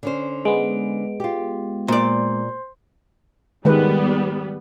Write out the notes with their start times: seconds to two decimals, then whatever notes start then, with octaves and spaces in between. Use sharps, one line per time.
0.03 D3 C#4 C5
0.45 G#3 B3 D7
1.20 F4 G4
1.88 A#2 C5 D5 C6
3.65 D#3 G3 G#3 B3 B4